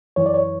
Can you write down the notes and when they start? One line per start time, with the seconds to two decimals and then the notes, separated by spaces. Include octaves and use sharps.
0.16 F#2 E3 C#5
0.26 D5
0.34 C#5